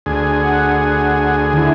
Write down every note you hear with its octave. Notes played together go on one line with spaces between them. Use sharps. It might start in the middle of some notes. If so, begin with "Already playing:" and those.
D2 G#4
F#5
D3 E4